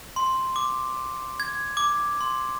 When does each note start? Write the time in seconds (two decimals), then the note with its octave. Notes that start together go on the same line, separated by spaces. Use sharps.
0.16 C6
0.56 D6
1.40 G#6
1.77 D6
2.21 C6